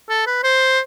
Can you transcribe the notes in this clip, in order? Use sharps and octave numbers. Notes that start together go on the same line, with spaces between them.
A4
B4
C5